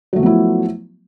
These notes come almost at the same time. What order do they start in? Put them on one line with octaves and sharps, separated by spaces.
F#3 A3 F3 B3 E4